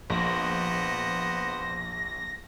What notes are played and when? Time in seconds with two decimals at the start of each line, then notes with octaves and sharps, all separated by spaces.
0.10 A#1 B3 C5 A#6